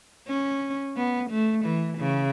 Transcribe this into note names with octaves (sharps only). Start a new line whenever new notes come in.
C#4
B3
A3
E3
C#3